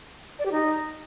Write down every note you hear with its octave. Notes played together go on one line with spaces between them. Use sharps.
D5
G4
D#4